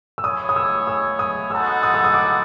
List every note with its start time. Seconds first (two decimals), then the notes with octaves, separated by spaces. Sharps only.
0.18 E6
0.24 B3 E4 G#4 C#5 D#6
0.49 D#6
0.56 E6
0.87 E6
1.19 D#6
1.51 G#3 B3 D#4 F#4 A4 E6
1.83 D#6
1.94 E6
2.04 D#6
2.14 D6